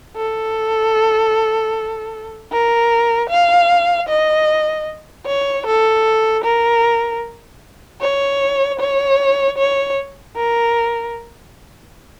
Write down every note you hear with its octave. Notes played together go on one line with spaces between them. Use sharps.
A4
A#4
F5
D#5
C#5
A4
A#4
C#5
C#5
C#5
A#4